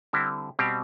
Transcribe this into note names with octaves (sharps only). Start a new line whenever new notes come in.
D3 G3 C4 E4
B2 G3 C4 G4